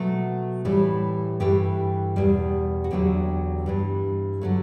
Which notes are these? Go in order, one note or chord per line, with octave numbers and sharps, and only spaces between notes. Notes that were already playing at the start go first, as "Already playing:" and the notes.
Already playing: B2 F#3 A3 E5
A2 E3 G3
G2 E3 A3 G4
E2 B2 G3
F#4
E2 D3 F#3 A3 G4
G2 E3 G3
D3 F#3 A3